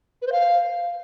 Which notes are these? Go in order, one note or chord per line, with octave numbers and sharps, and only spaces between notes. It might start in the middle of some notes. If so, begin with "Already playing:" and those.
B4
C5
F5